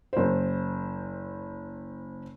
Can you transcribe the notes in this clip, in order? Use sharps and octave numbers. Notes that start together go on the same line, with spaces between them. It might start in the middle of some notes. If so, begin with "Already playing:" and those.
F#1 C5